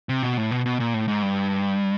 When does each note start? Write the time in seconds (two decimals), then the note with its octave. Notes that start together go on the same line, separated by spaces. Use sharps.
0.09 C3
0.23 B2
0.37 A2
0.51 B2
0.66 B2
0.80 A#2
0.94 A2
1.08 G#2
1.23 G2